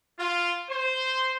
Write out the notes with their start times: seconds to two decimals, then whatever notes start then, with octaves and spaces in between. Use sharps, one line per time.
0.19 F4
0.70 C5